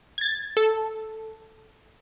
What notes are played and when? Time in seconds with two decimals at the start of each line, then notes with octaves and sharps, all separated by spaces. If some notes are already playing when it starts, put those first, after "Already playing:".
0.18 G#6 A6
0.57 A4